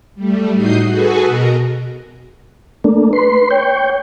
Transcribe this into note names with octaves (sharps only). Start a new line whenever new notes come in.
G3 A3
A2 D#4 F#4 D#6 G6 C7
F#4 G#4 A4 B4 G#5
B2 A#4 D#5 A#5
A3 A#3 D4
B4 C6
C#5 G5